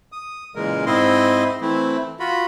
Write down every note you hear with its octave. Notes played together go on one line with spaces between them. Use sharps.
D#6
A#2 C#3 E3 G#3 A#4
G#2 C4 E4 D#5 C6
E3 A3 C4 E4
F4 F#4 B5